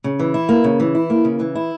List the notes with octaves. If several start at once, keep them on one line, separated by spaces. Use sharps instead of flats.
C#3
E3
E4
A#3
C#3
E3
E4
A#3
C#3
E3
E4